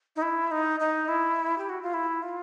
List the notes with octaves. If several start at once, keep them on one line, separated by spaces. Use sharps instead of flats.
D#4
E4
D#4
D#4
E4
G4
F#4
F4
E4
F4